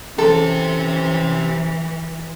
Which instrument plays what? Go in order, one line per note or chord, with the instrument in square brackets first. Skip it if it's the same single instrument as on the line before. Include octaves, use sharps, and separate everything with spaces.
[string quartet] E3 [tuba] C#4 [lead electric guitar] G4 C5 [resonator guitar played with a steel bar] A4